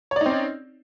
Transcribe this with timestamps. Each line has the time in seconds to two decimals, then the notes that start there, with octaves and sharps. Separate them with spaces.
0.11 C#5
0.16 D5
0.21 D#4
0.26 C4
0.31 C#4